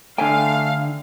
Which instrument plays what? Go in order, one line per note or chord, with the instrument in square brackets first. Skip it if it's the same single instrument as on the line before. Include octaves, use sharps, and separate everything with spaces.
[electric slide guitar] D3 A4 G5 [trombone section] A3 D4 [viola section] F5 [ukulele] G#5